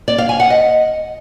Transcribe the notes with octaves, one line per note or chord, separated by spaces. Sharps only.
D5
F5
G#5
F#5
D#5